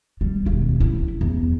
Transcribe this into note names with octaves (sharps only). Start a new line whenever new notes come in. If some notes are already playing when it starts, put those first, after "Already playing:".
G3
E1 D#2
E4
E2